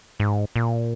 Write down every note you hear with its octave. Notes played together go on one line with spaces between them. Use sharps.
G#2
A#2